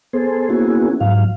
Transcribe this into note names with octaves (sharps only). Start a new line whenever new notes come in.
B3 G#4 A4 C5
A#3 B3 C#4 E4 F#4 G#4
G#2 F#3 F5